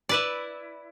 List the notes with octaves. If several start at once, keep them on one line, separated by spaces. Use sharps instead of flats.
E4 B4 D5